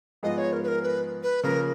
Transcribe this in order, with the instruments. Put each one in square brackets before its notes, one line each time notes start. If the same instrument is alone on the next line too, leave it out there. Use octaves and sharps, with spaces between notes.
[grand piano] G#2 F3 B3 F4 G#4 [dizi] D#5
[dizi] C#5
A#4
B4
A#4
B4
B4
[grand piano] C#3 F3 A#3 [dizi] A#4